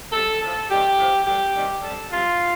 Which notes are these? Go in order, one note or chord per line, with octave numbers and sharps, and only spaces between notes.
C3 G3 A4
A2 F3 A4
C3 D#3 G3 G4
A2 F3
G2 D3 G3 G4
C3 D#3 G3
C3 G3 A4
C3 G3 F4